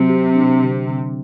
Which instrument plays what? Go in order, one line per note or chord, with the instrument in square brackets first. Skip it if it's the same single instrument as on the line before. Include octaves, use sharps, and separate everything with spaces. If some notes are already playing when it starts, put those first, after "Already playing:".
Already playing: [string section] C3 [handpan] F#3
[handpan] G4
D4
D3
D3